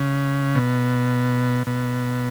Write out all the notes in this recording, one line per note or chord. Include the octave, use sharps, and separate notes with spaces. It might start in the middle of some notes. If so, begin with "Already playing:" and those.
Already playing: C#3
B2
B2